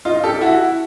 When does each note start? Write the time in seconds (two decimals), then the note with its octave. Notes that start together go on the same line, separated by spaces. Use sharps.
0.05 D#4 F4
0.24 G4 A4
0.41 E4 F#4